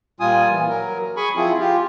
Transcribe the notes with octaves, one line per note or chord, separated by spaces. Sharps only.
A#2 G3 F4 G#5 D#6
E3
F#3 A#4
G#4 G#5 B5 C#6
F3 C4 E4 F4 G#4
F4 G4